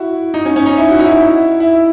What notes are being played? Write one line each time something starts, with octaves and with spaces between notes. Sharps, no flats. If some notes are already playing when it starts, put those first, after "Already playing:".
Already playing: E4 F#4
D#4
C#4
C#4
D#4
E4
F#4
D#4
E4
E4